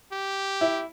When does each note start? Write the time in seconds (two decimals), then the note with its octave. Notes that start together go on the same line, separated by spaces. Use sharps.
0.12 G4
0.61 E4